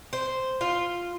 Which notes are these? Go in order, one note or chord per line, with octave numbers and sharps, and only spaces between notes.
C5
F4